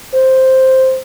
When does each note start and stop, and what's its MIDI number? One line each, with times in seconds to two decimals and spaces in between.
0.14 1.00 72